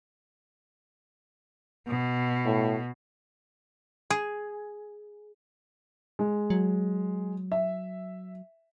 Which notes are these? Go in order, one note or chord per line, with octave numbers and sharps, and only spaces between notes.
B2
A2
G#4
G#3
F#3
E5